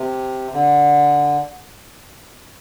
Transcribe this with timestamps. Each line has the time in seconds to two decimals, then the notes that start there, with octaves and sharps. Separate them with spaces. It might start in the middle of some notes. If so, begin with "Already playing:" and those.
Already playing: C3
0.54 D3